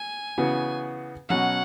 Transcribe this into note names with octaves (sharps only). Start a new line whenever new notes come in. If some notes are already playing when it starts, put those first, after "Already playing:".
Already playing: G#5
C#3 E3 B3 F#4
B2 F#3 C#4 F#5